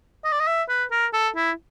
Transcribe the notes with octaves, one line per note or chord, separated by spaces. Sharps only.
D#5
D5
D#5
E5
B4
A#4
A4
E4